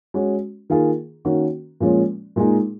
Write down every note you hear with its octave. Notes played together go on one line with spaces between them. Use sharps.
G#3 C#4 F#4
D#3 A#3 F4 G#4
D#3 A#3 C#4 F#4
A#2 F3 G#3 C#4
A#2 G#3 D#4 G#4